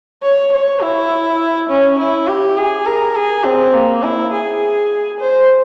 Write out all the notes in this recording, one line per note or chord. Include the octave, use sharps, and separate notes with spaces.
C#5
C#5
E4
C#4
E4
G4
G#4
A#4
G#4
C4
A#3
E4
G#4
C5